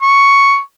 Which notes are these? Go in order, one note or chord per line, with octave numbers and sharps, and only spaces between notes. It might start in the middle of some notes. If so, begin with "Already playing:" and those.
C#6